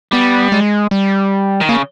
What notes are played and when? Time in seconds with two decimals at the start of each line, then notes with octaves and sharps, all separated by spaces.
0.12 G3 B3
0.52 G#3
0.91 G3
1.61 D#3
1.69 C#3 A#3